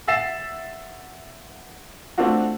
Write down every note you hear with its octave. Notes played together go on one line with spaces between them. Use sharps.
E5 F#5 E6 A6 C7 E7
A3 C4 D4 F4 F#4